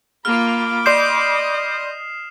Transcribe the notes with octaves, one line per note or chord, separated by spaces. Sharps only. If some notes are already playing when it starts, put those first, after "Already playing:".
A#3 F4 B5 D6 F6
D5 D#5 C6 D#6 G6 C7 E7